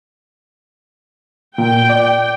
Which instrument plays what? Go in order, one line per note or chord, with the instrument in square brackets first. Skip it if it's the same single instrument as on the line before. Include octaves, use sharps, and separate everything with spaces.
[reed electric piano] A#2 [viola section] G5
[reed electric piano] D5